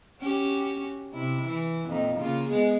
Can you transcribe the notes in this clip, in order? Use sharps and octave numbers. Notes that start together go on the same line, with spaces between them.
C#4 F#4 G4
C3 E4
E3
F2 A#2 D#4
C#3 A#3 F4
G#3 B3 G#4